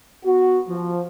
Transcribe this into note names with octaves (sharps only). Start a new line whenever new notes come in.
B3 F#4
F3